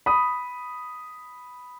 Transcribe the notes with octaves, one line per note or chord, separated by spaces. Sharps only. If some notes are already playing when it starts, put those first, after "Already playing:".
B5 D#6